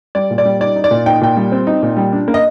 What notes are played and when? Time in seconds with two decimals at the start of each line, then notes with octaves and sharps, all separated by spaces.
0.15 G3 D5
0.31 A#2
0.38 D5
0.45 G3
0.60 D#4 D5
0.76 D#4
0.84 D5
0.91 A#2
1.06 D#4 G5
1.21 A#2 G5
1.37 G3
1.52 C4
1.67 D#4
1.83 A#2
1.97 G3
2.13 D4
2.28 A#3
2.34 D#5